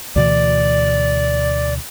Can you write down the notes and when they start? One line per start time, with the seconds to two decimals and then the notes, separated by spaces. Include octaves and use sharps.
0.16 D2 B2 E3 D5